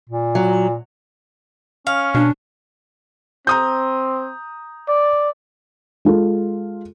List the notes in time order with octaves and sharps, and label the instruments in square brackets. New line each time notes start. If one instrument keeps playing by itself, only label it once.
[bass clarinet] A#2
[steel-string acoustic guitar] F#3
[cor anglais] C#4 [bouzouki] F5
[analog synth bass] B2 [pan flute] D4
[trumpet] C4 [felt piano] A#5 D#6 G6
[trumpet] D5
[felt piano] G#3 F4 A4